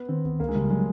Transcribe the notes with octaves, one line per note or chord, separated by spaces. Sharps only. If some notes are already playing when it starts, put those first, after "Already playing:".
Already playing: B3
D#3 C4
C#2 B3
C#2 A#3
G#3
C#3 G3
F#3 G#3